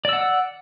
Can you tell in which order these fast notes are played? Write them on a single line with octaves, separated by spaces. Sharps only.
D5 E6 F#5